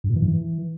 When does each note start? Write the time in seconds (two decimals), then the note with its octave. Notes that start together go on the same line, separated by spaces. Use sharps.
0.04 G2
0.10 A#2
0.16 E3
0.22 G2
0.28 E3